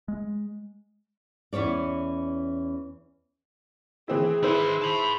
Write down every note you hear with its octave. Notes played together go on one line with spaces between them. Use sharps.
G#3
E2 E3 C#4 C#5 D5
E3 C4 E4 G#4
D#3 E4 B4 C5 B5
A5 B5